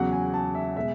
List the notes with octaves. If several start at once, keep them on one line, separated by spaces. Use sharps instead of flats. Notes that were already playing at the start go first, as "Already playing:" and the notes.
Already playing: E2 C#3 F#3 F#5
G#5
A5
E5
B2 G#3 E5